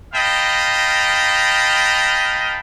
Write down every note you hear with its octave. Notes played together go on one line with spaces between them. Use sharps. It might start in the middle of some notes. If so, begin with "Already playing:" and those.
A#4 D#5 F5 G5 A5 B5